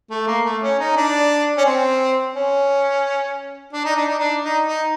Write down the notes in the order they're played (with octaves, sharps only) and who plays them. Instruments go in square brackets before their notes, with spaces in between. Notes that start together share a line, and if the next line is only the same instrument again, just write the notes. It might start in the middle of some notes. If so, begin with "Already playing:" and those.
[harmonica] A3
A#3
A3
C#4
D#4
D4
C#4
C4
C#4
D4
D#4
D4
D#4
D4
D#4
D#4